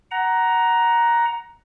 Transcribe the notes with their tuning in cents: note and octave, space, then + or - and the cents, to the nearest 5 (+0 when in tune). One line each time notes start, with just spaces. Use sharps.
F#5 +15 A#5 +10